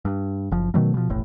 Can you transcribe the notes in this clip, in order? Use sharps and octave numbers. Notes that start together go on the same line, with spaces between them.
G2
F#1 F3
B2 D#3 F#3 A3
B2 F3
E1 A1 A2